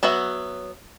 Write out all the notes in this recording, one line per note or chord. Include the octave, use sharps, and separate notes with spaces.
F#3 B3 F#4 E5